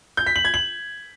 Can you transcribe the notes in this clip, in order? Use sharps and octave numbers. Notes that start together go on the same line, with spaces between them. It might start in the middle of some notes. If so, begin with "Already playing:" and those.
G6
B6
F#7
G#6
F#7